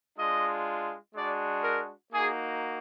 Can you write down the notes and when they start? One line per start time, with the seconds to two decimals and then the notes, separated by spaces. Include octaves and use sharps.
0.18 G#3 D4 F4 D#5
1.15 G#3 D4 F#4 D5
1.63 A#4
2.12 A#3 D#4 F#4 G#4